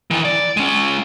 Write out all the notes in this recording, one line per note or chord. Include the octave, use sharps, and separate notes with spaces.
D#3 E3
D5
G#3 C#4